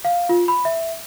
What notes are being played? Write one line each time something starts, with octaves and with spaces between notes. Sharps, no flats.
F5
F4
B5
E5